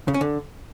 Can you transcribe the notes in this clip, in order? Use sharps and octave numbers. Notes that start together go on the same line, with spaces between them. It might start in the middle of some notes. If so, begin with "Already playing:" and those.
C#3
C#4
D3